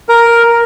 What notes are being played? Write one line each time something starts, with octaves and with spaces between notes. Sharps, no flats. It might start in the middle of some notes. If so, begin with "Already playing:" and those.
A#4